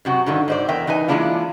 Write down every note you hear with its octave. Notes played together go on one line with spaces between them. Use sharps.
F#2 C3 F#4
G2 D3 D#3
G#2 C5 D5
E2 A#4 E5 G5
E3 D#4 B4 G#5
E3 G#3 A#3 D4 E4 F4